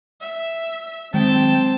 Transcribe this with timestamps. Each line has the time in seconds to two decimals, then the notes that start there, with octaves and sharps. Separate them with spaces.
0.22 E5
1.14 D#3 F#3 G#3 C4 G5 A5